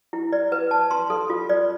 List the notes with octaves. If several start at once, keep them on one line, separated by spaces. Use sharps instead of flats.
E4
D5
B4
A5
C6
A4
F4
D5